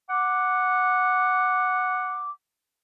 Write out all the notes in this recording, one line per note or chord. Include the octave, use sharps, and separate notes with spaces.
F#5 D6